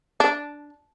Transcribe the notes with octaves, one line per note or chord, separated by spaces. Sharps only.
D4